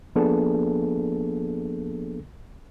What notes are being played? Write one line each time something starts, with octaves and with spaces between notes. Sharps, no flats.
F3 A#3 B3 D4 G#4 A4